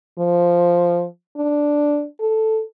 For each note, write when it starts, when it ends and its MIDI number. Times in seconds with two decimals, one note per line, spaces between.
0.19 1.05 53
1.37 2.05 62
2.20 2.62 69